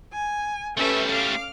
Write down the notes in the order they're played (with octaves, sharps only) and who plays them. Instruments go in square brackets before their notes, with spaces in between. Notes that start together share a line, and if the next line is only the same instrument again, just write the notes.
[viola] G#5
[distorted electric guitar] G3 A3 [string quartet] C#4 A4 B4 [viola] E5
[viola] F5 D6 [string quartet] F6